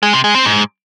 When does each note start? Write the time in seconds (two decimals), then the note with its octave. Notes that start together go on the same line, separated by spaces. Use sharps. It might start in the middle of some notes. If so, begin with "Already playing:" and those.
0.03 G#3
0.13 C3
0.24 G#3
0.35 C4
0.45 G#2